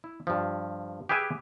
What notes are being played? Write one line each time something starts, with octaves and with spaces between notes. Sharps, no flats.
E4
G2 F3
G4 G#4 B4 E5 G#5